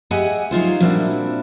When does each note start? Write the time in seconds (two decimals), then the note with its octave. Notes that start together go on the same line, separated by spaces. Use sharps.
0.11 G4 G#4 D#5 E5 F#5 G#5
0.51 F#3 D#4 F4 C5
0.80 A#2 G3 C4 D4 E4 F#4